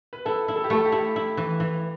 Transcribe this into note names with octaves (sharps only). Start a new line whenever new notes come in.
B4
E4 A4
E4
A4
G4
A3 A4
G4
E4
E4
E3
E3